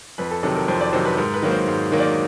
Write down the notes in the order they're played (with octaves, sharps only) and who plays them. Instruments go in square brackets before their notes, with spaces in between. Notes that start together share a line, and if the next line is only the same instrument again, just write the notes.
[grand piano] F2 B4
A4
C3 D#3 F#3 A4
A#4
F2 C5
D5
C3 D#3 F#3 C5
B4
G#2 A#4
B4
D#3 F#3 A#3
C5
G#2
D#3 F#3 A#3
D5